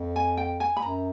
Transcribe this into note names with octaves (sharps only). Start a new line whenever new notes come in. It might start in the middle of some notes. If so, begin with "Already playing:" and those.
Already playing: F2
G#5
G5
G#5
B5
F#2 A#5